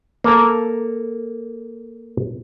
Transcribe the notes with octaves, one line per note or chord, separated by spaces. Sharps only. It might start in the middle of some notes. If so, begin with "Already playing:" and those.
A#3 A4 A#4